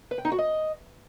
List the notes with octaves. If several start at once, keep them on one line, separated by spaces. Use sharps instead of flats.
B4
G5
D#4
F#4
D#5